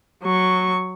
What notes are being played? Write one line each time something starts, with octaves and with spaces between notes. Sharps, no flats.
F#3 C#6